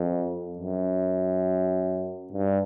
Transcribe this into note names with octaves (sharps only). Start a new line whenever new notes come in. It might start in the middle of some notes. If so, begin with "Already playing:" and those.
Already playing: F2
F#2
G2